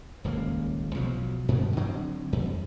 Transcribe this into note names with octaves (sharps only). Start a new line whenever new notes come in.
D#1 C#2 D3 A#3
B1 F3 F#3
G2 B2 D#3 B3
D3 F#3 C4
F2